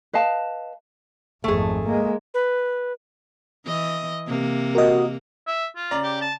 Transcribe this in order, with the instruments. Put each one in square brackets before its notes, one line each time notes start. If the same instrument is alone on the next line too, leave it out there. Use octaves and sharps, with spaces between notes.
[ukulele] B4 D#5 F5 A5
[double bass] G#1 F2 [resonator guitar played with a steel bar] A3 G#4
[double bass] G#3 A#3
[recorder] B4
[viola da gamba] E3 D#5
C3 A#3
[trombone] F#4 [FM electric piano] A#4 D#5
[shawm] E5
F4
[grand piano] C#3 D5 A#5
[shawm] G4
A5